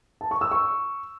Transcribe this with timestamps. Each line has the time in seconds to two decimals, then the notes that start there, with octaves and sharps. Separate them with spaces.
0.21 A5
0.31 C#6
0.41 E6
0.51 C#6